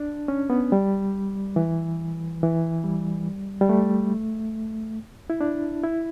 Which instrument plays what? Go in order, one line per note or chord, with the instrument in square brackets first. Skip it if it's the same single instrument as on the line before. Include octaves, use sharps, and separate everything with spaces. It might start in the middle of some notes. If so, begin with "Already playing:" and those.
Already playing: [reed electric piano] D4
C#4
B3
G3
E3
E3
G3
G3
A3
E4
D4
E4